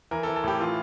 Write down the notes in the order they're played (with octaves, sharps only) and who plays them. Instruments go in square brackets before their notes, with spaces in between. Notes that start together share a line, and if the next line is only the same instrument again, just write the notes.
[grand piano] E3 A#4
A4
E3
A4
A2 G4
E3 F4